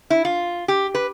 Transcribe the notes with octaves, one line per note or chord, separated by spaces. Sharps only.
E4
F4
G4
B4